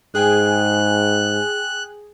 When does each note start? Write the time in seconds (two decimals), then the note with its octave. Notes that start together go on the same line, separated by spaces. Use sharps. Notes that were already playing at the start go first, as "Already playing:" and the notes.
0.15 G#2 G#4 G5 G#5 F#6